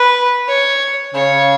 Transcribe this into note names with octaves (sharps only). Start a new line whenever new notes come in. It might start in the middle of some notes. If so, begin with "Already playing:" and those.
Already playing: B4
C#5
C#3 C#5